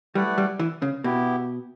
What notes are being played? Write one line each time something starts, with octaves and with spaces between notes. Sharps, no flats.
G3 A3 E4 B4 D5 F#5
G3
E3
C#3
B2 B3 E4 G4